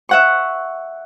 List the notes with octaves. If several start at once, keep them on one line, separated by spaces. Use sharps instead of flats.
E5 F#5 C#6